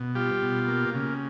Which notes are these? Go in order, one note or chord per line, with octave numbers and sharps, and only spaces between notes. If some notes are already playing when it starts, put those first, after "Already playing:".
Already playing: B2
G3 F4 G4
B2
A#3
C#3